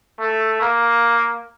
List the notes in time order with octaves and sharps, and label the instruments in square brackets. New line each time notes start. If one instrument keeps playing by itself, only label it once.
[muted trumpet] A3
A#3